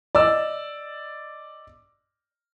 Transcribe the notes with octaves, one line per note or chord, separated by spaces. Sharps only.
D5 D#5 E6